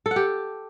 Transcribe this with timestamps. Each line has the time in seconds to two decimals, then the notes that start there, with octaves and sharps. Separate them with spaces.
0.06 A4
0.11 F#5
0.16 G4